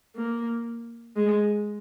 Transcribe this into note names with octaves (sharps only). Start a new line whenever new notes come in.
A#3
G#3